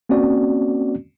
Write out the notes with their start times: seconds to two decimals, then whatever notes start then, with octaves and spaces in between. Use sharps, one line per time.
0.09 A#3 C4 C#4 F#4 D5